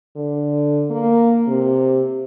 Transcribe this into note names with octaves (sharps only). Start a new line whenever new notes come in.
D3
A#3
C3